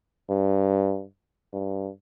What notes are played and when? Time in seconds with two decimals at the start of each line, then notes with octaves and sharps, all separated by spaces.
0.29 G2
1.53 G2